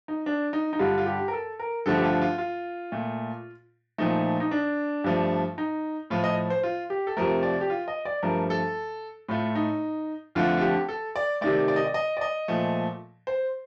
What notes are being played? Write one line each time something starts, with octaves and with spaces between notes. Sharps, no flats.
D#4
D4
D#4
D#4
G2 D3 G3 F4
F4
G4
A#4
A4
A#4
G2 D3 F3 A3 A4
G4
F4
F4
F4
A#2 A3
A#2 F3 A3 D#4
D#4
D4
G2 F3 A3
D#4
A2 F3 A3 F4
D#5
C5
F4
G4
A4
F2 C3 F3 A3 A#4
D5
G4
F4
D#5
D5
G2 F3 A3 A#4
A4
A2 A3 F4
D#4
F2 D3 F3 A3 F4
F4
G4
A4
D5
C3 D#3 A3 D5
D5
D#5
D5
D#5
D5
D#5
A#2 F3 A3
C5